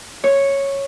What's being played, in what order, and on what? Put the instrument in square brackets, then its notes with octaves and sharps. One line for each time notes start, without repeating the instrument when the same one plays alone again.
[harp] C#5